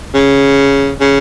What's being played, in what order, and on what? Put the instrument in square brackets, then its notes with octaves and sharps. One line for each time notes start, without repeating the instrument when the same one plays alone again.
[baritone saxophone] C#3
C#3